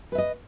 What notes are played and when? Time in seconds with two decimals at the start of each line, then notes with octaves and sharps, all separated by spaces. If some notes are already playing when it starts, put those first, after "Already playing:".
0.12 B4
0.15 E5
0.18 D#5